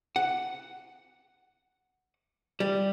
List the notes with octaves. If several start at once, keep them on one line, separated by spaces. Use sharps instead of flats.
F#5
G3